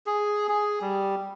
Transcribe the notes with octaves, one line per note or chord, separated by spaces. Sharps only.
G#4
G#4
G3